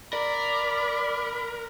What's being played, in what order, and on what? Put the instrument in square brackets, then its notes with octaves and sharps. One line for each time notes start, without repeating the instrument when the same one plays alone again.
[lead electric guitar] A#4 [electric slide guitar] D5 [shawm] B5 [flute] D6